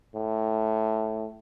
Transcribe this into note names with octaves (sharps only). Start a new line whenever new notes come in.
A2